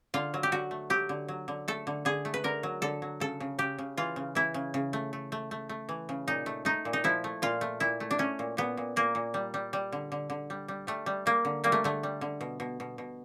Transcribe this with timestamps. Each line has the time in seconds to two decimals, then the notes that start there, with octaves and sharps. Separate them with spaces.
0.14 D3 F4
0.34 F#3
0.43 G4
0.52 D3 F#4
0.71 A3
0.90 F#3 G4
1.09 D3
1.28 F#3
1.48 D3
1.68 A3 A4
1.87 D3
2.05 D3 G#4
2.25 A3
2.34 B4
2.44 D3 A#4
2.63 F#3
2.82 D3 A4
3.02 F#3
3.20 C#3 A4
3.40 C#3
3.59 C#3 G4
3.79 C#3
3.97 E3 F4
4.16 C#3
4.35 E3 E4
4.54 C#3
4.74 C#3
4.93 A3
5.13 A3
5.32 A3
5.51 A3
5.69 A3
5.89 E3
6.09 C#3
6.27 A#2 D#4
6.46 A3
6.65 A3 D#4
6.85 A#2
6.93 D#4
7.04 F3 E4
7.24 A3
7.42 A#2 F4
7.61 A3
7.80 A#2 E4
8.00 A3
8.11 D4
8.19 A3 C#4
8.39 A#2
8.57 A#2 B3
8.77 A#2
8.96 A#2 A#3
9.15 A#2
9.34 G3
9.54 G3
9.73 G3
9.92 D3
10.12 D3
10.30 D3
10.50 G3
10.68 G3
10.87 G3 A3
11.06 G3
11.26 G3 A#3
11.45 D3
11.64 G3 A#3
11.72 A3
11.84 D3 A3
12.03 G3
12.21 D3
12.41 B2
12.60 B2
12.80 B2
12.98 B2